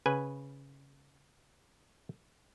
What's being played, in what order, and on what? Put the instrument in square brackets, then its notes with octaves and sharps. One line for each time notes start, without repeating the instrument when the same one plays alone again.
[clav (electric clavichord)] C#3 B4 G#5